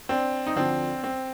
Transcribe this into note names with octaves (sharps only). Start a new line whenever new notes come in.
C4 D4
D#4
D2 D3 F3 C4 D4
C4